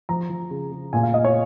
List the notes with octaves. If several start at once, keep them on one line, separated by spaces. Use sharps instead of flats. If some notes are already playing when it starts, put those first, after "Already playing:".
F3 A#5
F3
C#3
C#3
A#2 G#5
F5
A#2 D#5
C#5